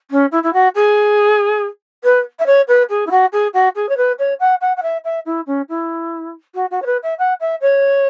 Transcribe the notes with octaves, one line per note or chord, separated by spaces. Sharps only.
C#4
E4
E4
F#4
G#4
B4
E5
C#5
B4
G#4
E4
F#4
G#4
F#4
G#4
C#5
B4
C#5
F#5
F#5
F#5
E5
E5
E4
C#4
E4
F#4
F#4
C#5
B4
E5
F#5
E5
C#5